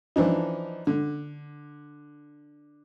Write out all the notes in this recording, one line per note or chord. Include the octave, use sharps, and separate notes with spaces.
E3 F3 D4 D#4
D3